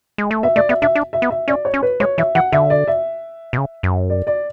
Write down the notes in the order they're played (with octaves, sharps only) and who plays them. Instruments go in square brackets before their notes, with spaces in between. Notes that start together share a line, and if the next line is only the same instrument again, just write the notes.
[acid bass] G#3
A3
[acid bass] B3 [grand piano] E5
[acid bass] A3 [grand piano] D5
[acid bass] B3 [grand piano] E5
[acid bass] D4 [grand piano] E5
[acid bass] D4
[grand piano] E5
[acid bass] B3
[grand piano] E5
[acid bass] C#4 [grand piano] D5
[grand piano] C#5
[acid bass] C#4
[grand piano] B4
[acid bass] G#3 [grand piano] C#5
[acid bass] E3 [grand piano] E5
[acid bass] E3 [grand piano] F#5
[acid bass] D3 [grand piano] E5
[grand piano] D5
E5
[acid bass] B2
C#3
F#2
[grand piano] D5
D5